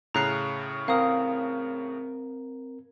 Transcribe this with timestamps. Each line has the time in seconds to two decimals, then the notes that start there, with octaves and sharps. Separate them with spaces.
0.14 A2 C#3 A#5 F#6 C7
0.88 C4 A#4 F5 D#6